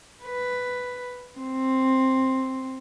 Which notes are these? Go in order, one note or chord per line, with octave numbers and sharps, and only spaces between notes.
B4
C4